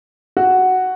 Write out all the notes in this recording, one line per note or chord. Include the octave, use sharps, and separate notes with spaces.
F#4